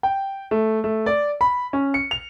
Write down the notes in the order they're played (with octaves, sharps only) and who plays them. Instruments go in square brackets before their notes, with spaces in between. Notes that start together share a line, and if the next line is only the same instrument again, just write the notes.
[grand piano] G5
A3
A3
D5
B5
C#4
C#7
F7